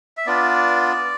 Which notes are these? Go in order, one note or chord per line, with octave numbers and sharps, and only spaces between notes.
E5
B3 D4 F4 D5